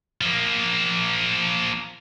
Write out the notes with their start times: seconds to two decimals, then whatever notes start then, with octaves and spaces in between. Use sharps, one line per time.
0.21 F3 A#3